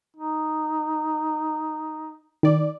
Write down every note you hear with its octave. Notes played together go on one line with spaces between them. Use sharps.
D#4
D#3 D5